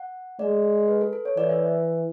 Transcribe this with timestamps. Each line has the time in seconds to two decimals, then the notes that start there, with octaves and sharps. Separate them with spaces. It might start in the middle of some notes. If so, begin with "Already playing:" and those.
Already playing: F#5
0.39 G#3 D5
0.88 B4
1.01 A4
1.13 A4
1.25 C#5
1.37 E3 D5
1.49 E5